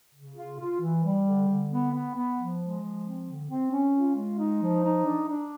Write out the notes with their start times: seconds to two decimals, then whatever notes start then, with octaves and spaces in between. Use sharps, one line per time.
0.13 C#3
0.36 F4
0.59 F4
0.80 E3
1.04 G3
1.25 D3
1.48 D3
1.70 B3
1.92 B3
2.15 B3
2.37 F3
2.60 G#3
2.82 F3
3.05 C4
3.26 D3
3.49 C4
3.71 C#4
3.94 F4
4.16 G#3
4.38 D#4
4.61 F3
4.84 D#4
5.05 D4
5.28 D4